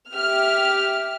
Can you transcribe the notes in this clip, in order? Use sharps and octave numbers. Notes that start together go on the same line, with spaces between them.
G4 E5 F6